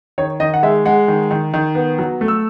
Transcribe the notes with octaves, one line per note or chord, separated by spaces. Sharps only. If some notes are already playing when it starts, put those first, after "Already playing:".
D#3 C#5
D#3 D#5
F#5
G#3 E5
G#3 F#5
D#3
D#3
D#3
B3
F#3
A3
E6